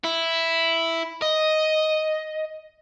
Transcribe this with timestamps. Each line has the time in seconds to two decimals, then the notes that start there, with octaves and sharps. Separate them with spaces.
0.04 E4
1.22 D#5